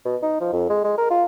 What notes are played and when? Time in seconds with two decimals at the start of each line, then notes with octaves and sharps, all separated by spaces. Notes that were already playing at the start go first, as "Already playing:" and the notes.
0.05 B2
0.22 D#4
0.40 F3
0.53 F2
0.69 G#3
0.84 G#3
0.98 A#4
1.10 F4